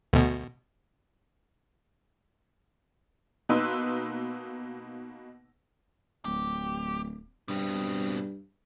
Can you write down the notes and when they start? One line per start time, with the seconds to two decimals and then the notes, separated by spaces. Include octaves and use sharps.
0.13 D2 B2
3.49 B2 A#3 D#4 B4 C6 E6
6.25 D1 G4
7.48 G2 B2 C4